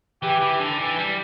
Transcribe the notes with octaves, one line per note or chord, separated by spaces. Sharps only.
E3 G4
E3
D3
E3
G3